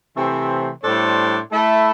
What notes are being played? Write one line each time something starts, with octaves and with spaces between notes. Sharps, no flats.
C3 E3 A3 C4
A2 G3 D4 A4 C5
A3 E4 A4